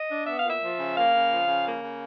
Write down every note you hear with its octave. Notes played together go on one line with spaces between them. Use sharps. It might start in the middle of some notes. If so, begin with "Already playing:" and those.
Already playing: D#5
D4
B3 E5
F5
A#2
E5
F3
C#3
A#3 F5
C#3
F3
C#3
A#3
C#3